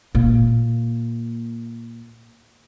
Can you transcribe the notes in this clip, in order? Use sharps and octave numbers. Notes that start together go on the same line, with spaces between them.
A#2 A#3